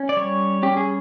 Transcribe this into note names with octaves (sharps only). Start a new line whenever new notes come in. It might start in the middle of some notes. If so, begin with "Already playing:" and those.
Already playing: C#4
D5
G3 C#5
C#4 G4
G#4